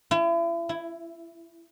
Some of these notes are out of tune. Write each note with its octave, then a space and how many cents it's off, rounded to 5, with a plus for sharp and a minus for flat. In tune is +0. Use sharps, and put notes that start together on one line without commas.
E4 +40
E4 +10